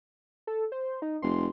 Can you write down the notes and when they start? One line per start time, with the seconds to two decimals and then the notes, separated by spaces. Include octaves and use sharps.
0.47 A4
0.72 C5
1.02 D#4
1.22 F1 C6